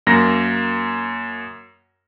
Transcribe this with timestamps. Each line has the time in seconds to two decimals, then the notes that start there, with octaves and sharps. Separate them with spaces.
0.07 F#2 A#3 A#6